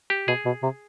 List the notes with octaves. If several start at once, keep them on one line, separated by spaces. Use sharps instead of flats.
G4
B2 G#4
B2
C3